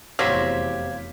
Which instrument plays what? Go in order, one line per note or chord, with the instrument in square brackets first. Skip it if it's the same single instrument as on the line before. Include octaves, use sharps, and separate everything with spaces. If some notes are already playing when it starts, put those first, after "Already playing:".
[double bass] F1 E2 [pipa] F#3 [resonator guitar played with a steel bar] G4 C5 [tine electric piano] F5 G#6 B6